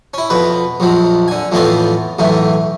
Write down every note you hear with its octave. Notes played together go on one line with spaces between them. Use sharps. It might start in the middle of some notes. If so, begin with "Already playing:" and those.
C#4 E4
F2 B2 B4
A#1 F2 F3 F#3
D3 G#5
F2 A2 E3 B3 C4 F4
B1 E2 A2 E3 A3